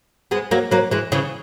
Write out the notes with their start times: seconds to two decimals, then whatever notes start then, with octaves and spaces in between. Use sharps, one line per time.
0.31 G#3 B3
0.51 F#3 A#3
0.71 F#3 A#3
0.91 E3 G#3
1.12 C#3 E3